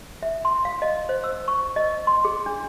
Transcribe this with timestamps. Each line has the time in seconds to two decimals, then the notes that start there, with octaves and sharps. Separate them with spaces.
0.23 E5
0.45 C6
0.65 F5
0.82 D#5
1.09 C5
1.24 E6
1.48 C#6
1.76 D#5
2.07 C6
2.25 G#4
2.46 D4